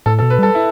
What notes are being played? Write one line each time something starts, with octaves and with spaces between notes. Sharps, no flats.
A2 A4
A4
B2
B4
G3 A4
E4